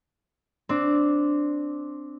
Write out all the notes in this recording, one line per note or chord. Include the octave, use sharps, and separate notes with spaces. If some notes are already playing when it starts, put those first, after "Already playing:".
C4 D4